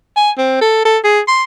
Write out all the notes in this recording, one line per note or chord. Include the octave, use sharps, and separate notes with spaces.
G#5
C4
A4
A4
G#4
C6